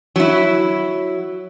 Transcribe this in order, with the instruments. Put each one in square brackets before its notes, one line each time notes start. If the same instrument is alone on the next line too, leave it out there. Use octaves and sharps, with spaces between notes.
[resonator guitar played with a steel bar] F#3 E4